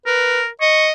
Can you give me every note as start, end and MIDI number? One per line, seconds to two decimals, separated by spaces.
0.06 0.47 70
0.06 0.40 71
0.61 0.92 75
0.61 0.87 85